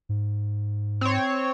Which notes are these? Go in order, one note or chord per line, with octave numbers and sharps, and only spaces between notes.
G#2
C4 C#5